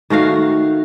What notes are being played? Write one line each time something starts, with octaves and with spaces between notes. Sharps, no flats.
D#3 A3 F#4 F5